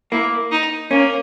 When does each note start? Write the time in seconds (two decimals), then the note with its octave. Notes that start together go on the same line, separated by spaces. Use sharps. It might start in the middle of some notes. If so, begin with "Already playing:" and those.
0.12 A#3 E4
0.51 D#4
0.91 A#3 C#4